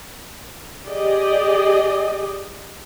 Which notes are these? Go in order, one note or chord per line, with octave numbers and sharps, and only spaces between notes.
G4 G#4 D5 D#5